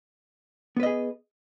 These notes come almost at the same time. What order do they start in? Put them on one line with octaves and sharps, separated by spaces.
B3 B4 D#5 G#4